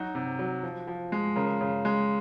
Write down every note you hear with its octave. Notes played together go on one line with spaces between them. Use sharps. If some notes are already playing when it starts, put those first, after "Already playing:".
Already playing: F#3 D#4 F#4
C3
F#3
F3
F3
G#3
C#3 A#4
C#3
G#3